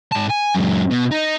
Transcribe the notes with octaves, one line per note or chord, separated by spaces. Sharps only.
G#2 A5
G#5
F#2 G#3
B2 B3
D#4